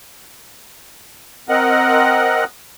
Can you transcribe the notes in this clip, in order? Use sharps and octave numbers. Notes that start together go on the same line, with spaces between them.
C4 A#4 D#5 F#5